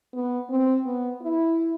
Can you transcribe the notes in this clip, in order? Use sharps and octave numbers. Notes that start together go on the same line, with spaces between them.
B3
C4
B3
E4